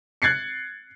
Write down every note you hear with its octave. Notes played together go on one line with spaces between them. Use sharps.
F#6 G#6 A6 C7 C#7